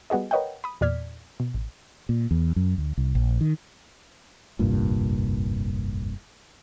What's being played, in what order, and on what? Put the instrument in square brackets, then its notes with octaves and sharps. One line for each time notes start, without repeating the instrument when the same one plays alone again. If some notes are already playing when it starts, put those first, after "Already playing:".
[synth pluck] G3 B3 F#4 G#4 D#5
A#4 B4 C#5 D#5 F#5 G5
B5 D#6
E2 A#2 D5 F6 G#6 B6
B2
A1
[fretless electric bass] A#2
E2
F#2
D2
C2
A#1
D#3
F1 C2 G2 A#2